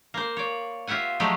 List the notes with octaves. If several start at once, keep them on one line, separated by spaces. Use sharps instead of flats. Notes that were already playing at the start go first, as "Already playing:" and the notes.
A#3 C5
C#5 D5
F4 G4 E5 F#5 G#5
F3 F#3 G#3 A3 G4